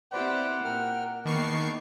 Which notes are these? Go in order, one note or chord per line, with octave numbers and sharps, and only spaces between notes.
C4 E4 G4 B4 C5 D5 F#5
A#2 A#4 G5 F6
E2 D#3 A#3 B4 A5 C#6 D6 C7